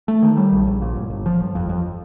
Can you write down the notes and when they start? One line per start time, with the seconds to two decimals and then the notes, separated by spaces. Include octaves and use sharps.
0.08 A3
0.22 D#3
0.37 G3
0.52 A#1
0.67 A#1
0.82 A#2
0.96 G1
1.10 G1
1.26 F3
1.40 G1
1.55 F2
1.69 F2